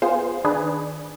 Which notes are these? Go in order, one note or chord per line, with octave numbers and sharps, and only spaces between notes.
B3 F4 G#4 C5
D#3 D4 G#4 B4